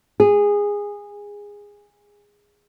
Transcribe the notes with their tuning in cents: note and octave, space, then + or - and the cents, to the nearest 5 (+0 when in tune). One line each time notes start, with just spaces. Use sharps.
G#4 -15